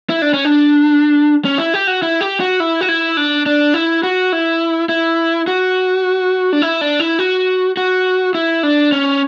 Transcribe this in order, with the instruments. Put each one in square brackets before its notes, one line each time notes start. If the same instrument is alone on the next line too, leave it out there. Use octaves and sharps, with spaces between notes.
[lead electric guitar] E4
D4
C#4
D4
C#4
E4
G4
F#4
E4
G4
F#4
E4
F#4
E4
D4
D4
E4
F#4
E4
E4
F#4
D4
E4
D4
E4
F#4
F#4
E4
D4
C#4